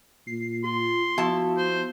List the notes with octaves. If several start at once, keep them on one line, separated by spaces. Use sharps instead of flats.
A#2 C7
F4 C6
F3 B3 E4 F#4 A5
C5